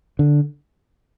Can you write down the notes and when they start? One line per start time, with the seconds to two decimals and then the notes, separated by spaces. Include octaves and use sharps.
0.19 D3